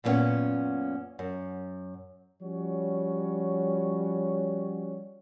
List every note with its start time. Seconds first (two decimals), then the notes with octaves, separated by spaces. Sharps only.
0.04 F#2 A#2 F3 B3 C#4 F#5
1.19 F#2
2.41 F3 G3 C#4 F#4 C#5